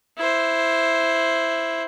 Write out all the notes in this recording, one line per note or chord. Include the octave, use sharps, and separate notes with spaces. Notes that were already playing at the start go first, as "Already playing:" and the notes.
E4 C5